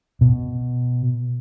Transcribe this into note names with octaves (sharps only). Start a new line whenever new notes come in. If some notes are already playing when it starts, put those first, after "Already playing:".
B2